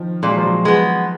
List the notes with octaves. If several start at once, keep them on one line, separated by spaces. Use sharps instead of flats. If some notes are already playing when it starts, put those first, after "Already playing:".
Already playing: D#3 F3
A#2 G#3
F#3
F3
F#3
G#3 B3